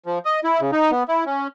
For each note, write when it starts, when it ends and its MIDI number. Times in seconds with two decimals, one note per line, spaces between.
0.06 0.19 53
0.25 0.40 75
0.44 0.60 64
0.60 0.71 49
0.72 0.91 63
0.91 1.03 59
1.08 1.24 64
1.26 1.47 61